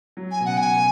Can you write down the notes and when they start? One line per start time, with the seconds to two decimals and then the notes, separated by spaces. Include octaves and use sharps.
0.17 F#3
0.31 G#5
0.40 B2
0.45 C#3 F#5
0.58 G#5
0.77 B2